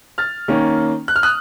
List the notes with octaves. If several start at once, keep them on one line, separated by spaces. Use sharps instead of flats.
F6 A6
D#3 A#3 C#4
F#6
F6
D#6 F#6